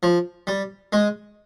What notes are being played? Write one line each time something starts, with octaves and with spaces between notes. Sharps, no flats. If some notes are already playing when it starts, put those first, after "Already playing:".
F3
G3
G#3